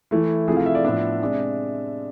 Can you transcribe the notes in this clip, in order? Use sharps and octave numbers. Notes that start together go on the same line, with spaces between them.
E3 A3 E4
C3 F3 A3 E4 G#4
F5
E5
D5
A2 F3 B3 D4 E5
C3 G#3 D4